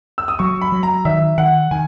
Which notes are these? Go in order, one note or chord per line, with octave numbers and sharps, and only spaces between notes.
E6
D#6
F#3 C#6
B5
F#3
A#5
D#3 E5
D#3 F#5
D#3 G#5